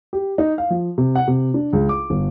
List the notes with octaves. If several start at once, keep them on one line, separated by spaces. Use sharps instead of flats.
G4
D#4
F5
F3
C3
F#5
C3
D4
C#2
D6
G1